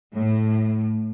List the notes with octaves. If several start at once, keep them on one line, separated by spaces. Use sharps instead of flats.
A2